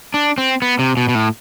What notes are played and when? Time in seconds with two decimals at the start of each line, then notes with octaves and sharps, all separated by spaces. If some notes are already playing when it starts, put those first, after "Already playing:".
0.14 D4
0.38 C4
0.62 B3
0.79 C3
0.97 B2
1.09 B2
1.15 A2